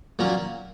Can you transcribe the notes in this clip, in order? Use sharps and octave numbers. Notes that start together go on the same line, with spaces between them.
A#2 F#3 A#3 C#4